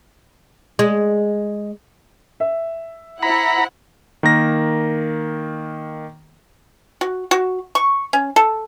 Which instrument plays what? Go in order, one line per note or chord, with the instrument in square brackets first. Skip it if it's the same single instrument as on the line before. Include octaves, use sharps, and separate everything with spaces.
[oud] G#3
[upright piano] E5
[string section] E4 C5 F#5 [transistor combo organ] A#5 B5
[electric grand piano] D#3 A#3 A#6
[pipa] F#4
F#4
C#6
C#4
A4